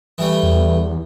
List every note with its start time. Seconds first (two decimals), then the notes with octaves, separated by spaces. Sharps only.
0.18 E3 G3 A3
0.43 E2